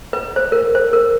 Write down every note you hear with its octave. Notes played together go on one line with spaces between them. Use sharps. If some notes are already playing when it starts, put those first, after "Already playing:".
B4
C5
A#4
C5
A#4